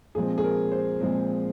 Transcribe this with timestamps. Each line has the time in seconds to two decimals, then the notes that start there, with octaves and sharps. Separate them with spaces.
0.15 A#2 F3 G#3 C4 G#4
0.38 G#4
0.44 A#4
0.72 C5
1.00 A#2 F3 G#3 C4